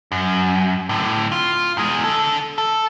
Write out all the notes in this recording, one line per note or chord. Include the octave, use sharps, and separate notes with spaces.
F#2
A2 D3
F4
E2 G#3
D3 A4
A4